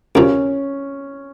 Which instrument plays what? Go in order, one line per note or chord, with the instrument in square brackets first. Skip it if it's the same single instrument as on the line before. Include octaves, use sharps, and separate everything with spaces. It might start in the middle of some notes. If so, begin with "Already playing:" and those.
[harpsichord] D#2 C#3 F3 [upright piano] C#4